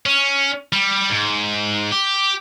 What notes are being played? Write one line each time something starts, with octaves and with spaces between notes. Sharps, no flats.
C#4
G3
G#2
G4